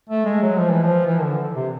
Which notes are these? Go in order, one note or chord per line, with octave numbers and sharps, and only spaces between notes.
A3
G#3
F#3
F3
E3
F3
E3
D3
C3